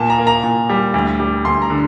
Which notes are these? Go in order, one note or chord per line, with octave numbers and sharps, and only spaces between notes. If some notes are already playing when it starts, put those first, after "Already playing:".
Already playing: A#2 A5
A#5
A#3
A#5
A#2
G3
D2
G3
D2 C6
A#5
D3